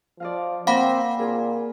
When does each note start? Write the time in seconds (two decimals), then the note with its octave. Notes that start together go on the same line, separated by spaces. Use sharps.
0.20 F3 D5 D#5 F5
0.67 A#3 C4 F5 F#5 B5 D6
1.19 A#2 F4 G#4 A#4